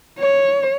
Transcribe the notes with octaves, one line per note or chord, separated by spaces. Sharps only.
C#5